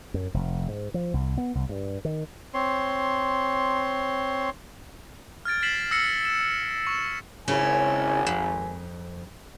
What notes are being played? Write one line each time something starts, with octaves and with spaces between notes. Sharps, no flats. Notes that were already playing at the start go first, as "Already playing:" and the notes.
F#2
F1
G#2
F3
C2
B3
C2
G2
D#3
C4 C#5 C6
F6 G#6 A6 D7
A6 B6 C7 E7 F#7
E6 F6 A#6 C7 C#7
E7
C#6 E7
G#1 C#3 C#4 E4 G#5
F2